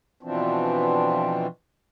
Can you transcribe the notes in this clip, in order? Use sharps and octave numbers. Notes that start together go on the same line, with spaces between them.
B2 E3 F3 C4 D4